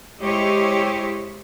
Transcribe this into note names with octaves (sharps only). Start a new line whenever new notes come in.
G#3 E4 G4 C5 C#5 D#5